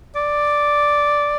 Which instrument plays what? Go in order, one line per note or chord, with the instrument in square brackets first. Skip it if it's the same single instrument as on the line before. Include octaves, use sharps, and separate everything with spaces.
[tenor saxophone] D5